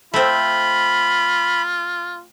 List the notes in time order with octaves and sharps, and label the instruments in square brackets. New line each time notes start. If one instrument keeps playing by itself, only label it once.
[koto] A3 C4 [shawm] F4 [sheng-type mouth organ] B5